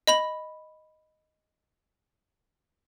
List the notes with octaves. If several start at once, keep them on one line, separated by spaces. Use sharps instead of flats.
D#5 B5 F#7